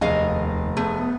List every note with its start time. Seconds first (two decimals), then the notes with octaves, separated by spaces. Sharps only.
0.01 F1 D#2 G#4 D#5 F5
0.77 A3 B3 G#4